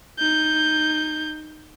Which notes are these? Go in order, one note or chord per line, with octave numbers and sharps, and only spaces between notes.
D#4 G6